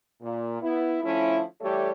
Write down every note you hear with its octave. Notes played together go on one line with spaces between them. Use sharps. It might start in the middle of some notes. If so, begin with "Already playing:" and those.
A#2
B3 E4
D3 F3 A3 C#4 E4
E3 G3 A3 G4 A4 C#5